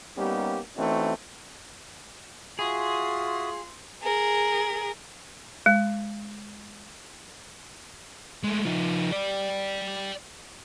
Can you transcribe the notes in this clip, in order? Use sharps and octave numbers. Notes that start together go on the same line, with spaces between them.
G3 A#3 B3 C#4 D#4 G4
E3 A3 C4 C#4 D#4 F#4
F4 F#4 G#4 E5 C6 D#6
G#4 A#4
G#3
G#3 A3
F3 D#4
D5 G5